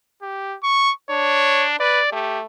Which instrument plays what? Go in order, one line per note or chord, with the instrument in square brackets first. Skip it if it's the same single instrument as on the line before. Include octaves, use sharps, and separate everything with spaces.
[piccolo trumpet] G4
C#6
[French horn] D4 [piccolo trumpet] C#5
[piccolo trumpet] B4 [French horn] D5
[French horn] A3 [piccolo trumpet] G4